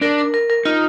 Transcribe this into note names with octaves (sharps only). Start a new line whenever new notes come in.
D4 A#4
A#4
A#4
A#4
D#4 F4